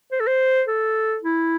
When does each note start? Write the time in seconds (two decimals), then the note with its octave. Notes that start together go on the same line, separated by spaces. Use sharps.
0.12 C5
0.20 A4
0.27 C5
0.68 A4
1.23 E4